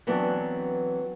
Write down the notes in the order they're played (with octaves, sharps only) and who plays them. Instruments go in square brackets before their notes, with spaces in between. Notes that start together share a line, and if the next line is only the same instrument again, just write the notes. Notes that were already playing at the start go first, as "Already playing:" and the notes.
[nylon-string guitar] E3 F#3 B3 C4 D4